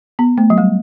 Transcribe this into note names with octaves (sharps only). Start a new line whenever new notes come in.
B3
A3
F#3
G3